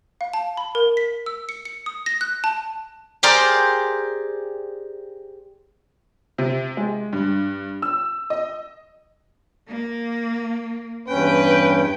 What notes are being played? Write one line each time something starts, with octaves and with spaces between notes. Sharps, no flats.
F5
A5
B5
A#4
B6
E6
C#7
C#7
D#6
A#6
F#6
A5
G4 G#4 A#4 C5 D5
C3
G#3
G2
E6
D#5
A#3
E2 G2 C#4 B4 G5